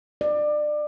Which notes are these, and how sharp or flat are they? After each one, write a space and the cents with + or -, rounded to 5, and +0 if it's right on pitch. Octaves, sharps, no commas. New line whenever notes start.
D5 +25